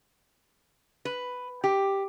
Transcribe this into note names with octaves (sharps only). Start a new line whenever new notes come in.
B4
G4